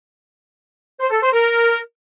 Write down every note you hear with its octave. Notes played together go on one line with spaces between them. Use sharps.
C5
A4
C5
A#4